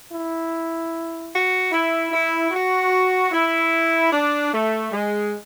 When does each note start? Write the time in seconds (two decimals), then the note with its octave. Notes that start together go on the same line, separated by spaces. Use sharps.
0.10 E4
1.31 F#4
1.71 E4
2.11 E4
2.51 F#4
3.31 E4
4.11 D4
4.52 A3
4.92 G#3